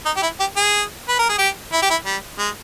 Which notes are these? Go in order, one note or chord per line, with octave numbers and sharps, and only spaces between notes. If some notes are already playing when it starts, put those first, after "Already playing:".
D#4
G4
E4
G4
G#4
B4
A#4
G#4
G4
E4
G4
E4
G3
G#3